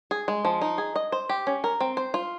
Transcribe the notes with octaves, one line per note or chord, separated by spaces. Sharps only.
G#4
G#3
F3
D#4
G#4
D#5
C5
G4
C#4
A#4
C4
C5
F4